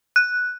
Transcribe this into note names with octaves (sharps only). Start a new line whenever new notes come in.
F#6